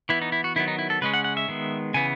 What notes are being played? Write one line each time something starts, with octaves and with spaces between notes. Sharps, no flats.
E3 B3 E4
D#4
E4
F#4
D#3 F#3 B3 E4
D#4
E4
A4
C#3 G#3 C#4 B4
F#5
F#5
E5
D#3 G#3 B3
C#3 E3 B3 G#5